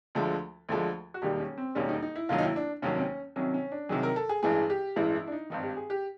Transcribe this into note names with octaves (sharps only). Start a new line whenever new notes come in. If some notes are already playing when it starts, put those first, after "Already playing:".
D2 D3 F3 G#3
D2 D3 F3 G#3
F#4
E1 D#2 D#3 G3 G4
C#4
C4
E1 D#2 D#3 G3 C#4
D#4
D#4
E4
F1 D#2 D#3 F#3 F4
D#4
E4
D4
F1 D#2 D#3 F#3 C#4
C4
C#4
C2 C3 D#3 F#3 C#4
C#4
D4
C2 C3 D#3 F#3 G#4
A#4
A4
G#4
A1 G2 E3 G#3 G#4
G4
A1 G2 E3 G#3 E4
E4
D4
D#4
G#1 G2 D#3 D#4
G4
G#4
G4